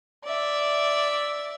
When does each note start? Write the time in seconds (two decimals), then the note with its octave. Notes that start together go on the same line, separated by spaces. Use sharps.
0.24 D5 E5